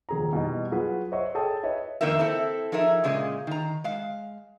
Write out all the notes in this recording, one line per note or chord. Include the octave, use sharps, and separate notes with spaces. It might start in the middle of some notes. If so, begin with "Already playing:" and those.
D#1 G#4 A#5
B2 E3 G3 D#4
F#3 F4 F#4 G#4 B4
C5 C#5 D#5 E5 F#5 C#6
G#4 A4 C#5 G5 A5 D#6
B4 C#5 D#5 E5 A5
F2 D#3 A#3 D#4 A#4 E5
C4 E4 A4
F3 D#4 G#4 A#4 E5
A#2 C#3 G#3 C5 D#5
D#3 A#5
G#3 F5